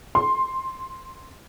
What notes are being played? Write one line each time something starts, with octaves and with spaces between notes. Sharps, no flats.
C6